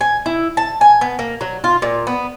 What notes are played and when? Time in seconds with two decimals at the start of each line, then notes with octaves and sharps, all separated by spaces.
0.01 G#5
0.26 E4
0.57 A5
0.81 G#5
1.01 B3
1.19 A#3
1.41 F#3
1.64 F4
1.82 A#2
2.07 B3